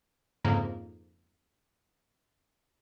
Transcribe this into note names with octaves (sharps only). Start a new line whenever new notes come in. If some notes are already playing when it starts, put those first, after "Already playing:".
F2 G#2 C#3 A#3